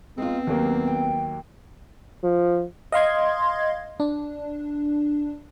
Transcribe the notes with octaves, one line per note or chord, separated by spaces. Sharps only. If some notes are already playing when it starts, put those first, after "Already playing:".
G#3 B3 C4 D#4 F4
D#2 F#3 A#3 G4
G5
F3
D#5 F5 C6 G#6
D4